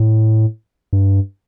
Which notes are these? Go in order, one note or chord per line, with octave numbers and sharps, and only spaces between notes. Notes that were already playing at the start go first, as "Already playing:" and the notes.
Already playing: A2
G2